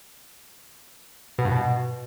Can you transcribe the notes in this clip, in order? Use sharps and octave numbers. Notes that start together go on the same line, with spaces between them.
B2
G2
B2